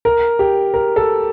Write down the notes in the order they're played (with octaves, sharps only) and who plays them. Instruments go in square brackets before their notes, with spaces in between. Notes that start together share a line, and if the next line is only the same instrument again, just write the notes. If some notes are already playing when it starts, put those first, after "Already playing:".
[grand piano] A#4
G4
A#4
A4